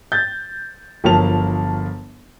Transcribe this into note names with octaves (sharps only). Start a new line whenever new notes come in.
G6 A6
G1 F3 F#3 A#4 A5 F7